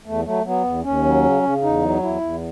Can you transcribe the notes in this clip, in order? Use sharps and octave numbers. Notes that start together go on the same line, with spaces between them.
E2 A3
F#3 A3
F#3 B3
E2
D#2 C#4
F#3
C#3
C#3
E2 D#4
F#3
E2 E4
E2